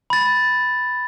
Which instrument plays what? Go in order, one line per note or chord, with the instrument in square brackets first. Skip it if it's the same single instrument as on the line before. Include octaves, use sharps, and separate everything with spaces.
[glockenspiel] B5 A6